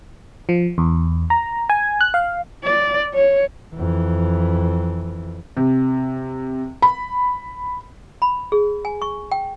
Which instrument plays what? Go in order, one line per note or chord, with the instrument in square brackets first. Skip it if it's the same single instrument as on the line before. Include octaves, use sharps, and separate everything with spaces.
[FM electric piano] F3
E2
A#5
G#5
F#6
F5
[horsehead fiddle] D5
C#5
[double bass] F2 E3
[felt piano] C3
B5
[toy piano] B5
G#4
G#5
C#6
G5